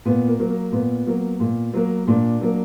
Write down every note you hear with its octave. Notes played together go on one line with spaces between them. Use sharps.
A#2 B3
A#3
F#3 A#3
A#3
A#2 B3
F#3 A#3
A#2
F#3 A#3
A#2 D4
F#3 A#3